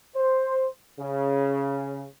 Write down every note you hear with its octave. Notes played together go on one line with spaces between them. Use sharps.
C5
C#3